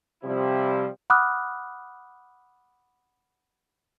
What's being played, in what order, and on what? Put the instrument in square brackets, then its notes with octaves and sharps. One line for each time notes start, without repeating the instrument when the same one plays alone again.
[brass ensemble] C3 F3 G3 E4
[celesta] F#5 B5 D6 D#6 F6 F#6